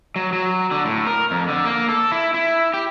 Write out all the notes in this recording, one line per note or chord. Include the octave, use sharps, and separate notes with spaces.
F#3
F#3
D3
A2
A#4
F2
D3
A#3
A4
E4
E4
G4